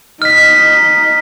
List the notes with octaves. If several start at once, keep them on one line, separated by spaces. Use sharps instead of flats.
D#4 D#5 F6 B6